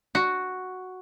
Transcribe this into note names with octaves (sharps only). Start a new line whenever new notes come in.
F#4